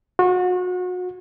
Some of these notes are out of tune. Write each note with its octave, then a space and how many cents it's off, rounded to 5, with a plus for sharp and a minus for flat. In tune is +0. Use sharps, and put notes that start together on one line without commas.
F#4 -35